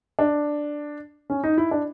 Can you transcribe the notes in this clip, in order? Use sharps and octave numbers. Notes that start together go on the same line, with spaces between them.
D4
C#4
D#4
E4
D4